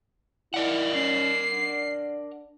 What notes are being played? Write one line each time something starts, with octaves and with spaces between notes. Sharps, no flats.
E4 A#4 D5 F#5
C#4 C7
D4